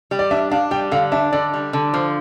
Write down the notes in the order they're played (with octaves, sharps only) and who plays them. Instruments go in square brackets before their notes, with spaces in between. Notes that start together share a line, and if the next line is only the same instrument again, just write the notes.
[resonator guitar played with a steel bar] G3
[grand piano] D5
[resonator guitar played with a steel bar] D4 [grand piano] E5
[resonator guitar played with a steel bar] D4 [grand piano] F5
[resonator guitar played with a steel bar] G3 [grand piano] G5
[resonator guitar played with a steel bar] D3 [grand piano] F5
[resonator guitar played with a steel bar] D4 [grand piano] E5
[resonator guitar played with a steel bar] D3 [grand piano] D5
[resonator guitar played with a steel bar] G3
D3
[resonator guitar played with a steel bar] F3 [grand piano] C5